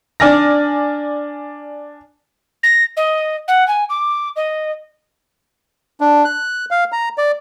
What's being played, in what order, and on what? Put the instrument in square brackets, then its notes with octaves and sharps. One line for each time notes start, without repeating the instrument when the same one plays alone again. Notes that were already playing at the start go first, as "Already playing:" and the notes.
[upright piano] D4 D5 G#5 F6 A#6
[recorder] A#6
D#5
F#5
G#5
D6
D#5
[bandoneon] D4
F#6
F5
A#5
D5